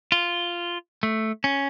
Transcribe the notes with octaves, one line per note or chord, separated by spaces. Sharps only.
F4
A3
C#4